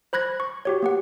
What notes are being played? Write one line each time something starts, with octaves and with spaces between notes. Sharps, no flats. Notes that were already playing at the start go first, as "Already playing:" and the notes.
C5 B5 F#6 G#6 A#6
C#6
F#4 G4 C#5
A#3 G4 F#5